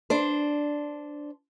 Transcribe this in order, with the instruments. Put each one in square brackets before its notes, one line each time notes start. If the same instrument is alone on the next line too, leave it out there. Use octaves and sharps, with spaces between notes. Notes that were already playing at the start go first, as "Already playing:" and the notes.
[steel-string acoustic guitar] D4 C5